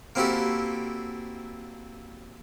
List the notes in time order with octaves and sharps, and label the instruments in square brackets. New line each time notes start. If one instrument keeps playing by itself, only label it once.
[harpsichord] A#3 C4 E4 F#4 G4 A4